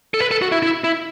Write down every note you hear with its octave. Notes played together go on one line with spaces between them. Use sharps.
A4
B4
A4
F#4
E4
E4
E4